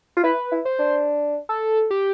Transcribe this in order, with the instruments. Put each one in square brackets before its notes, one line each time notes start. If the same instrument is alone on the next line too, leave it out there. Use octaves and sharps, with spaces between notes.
[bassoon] F4
[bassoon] E4 [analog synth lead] B4
[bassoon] E4
[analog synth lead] C5
[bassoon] D4
[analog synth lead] A4
G4